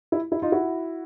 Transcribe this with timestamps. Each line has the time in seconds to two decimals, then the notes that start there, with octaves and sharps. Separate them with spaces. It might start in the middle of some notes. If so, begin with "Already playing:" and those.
0.12 E4
0.32 E4
0.42 D#4 F4
0.52 E4 F#4